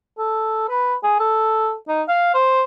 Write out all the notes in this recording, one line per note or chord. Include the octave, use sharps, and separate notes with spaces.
A4
B4
G#4
A4
D#4
F5
C5